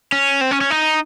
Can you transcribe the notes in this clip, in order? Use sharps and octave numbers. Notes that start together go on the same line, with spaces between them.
C#4
C4
C#4
C#4
D#4